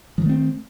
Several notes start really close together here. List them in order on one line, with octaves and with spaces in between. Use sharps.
F3 D#3 A3 C4